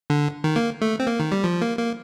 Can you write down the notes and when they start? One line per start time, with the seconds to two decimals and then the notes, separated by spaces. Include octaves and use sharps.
0.10 D3
0.44 D#3
0.56 A#3
0.81 A3
1.00 C4
1.07 A#3
1.20 D#3
1.32 G3
1.44 F3
1.61 A#3
1.78 A#3